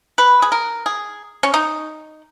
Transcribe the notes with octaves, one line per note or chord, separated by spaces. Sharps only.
B4
G#4
A#4
G#4
C#4
D#4